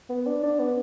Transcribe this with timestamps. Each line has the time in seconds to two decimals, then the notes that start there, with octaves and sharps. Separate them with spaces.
0.09 B3
0.26 D4
0.43 D4
0.59 B3